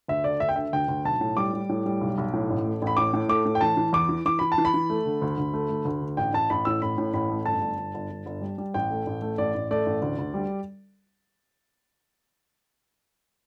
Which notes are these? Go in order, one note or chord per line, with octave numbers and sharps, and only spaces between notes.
D2 E5
D3 D5
D2 E5
G5
D3 E5
D2 G5
D2
B1 A5
A2
G3 D6
G3
A2
G3
B1
B1
A2
A1
A3
A1
B5
A2 D6
A2
A3 D6
A2
G5
E3 A5
E3
E2 D6
E3
E3 D6
E3 B5
A5
E3
B5
E3
A3
D3
D2
D2
A3
D2
D2
D3
A1 G5
A1 A5
A1 B5
A2 E6
A1 B5
A2
A1 B5
A3
G1 A5
G1
G1
G1
G1
G1
G3
G3
A1 G5
A3
A1
A3
A1 D5
A1
A3 D5
A1
D2
D2
G3